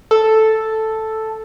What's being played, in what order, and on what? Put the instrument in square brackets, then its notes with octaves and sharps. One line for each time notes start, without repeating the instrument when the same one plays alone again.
[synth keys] A4